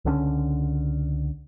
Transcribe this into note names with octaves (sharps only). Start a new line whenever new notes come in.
C#2 D3 A3 C#4